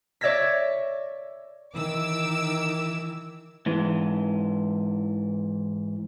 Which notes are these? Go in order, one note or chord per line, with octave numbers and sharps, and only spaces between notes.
C#5 D5 E5 G#6 A#6 B6
D#3 E3 D6 E6
G#2 E3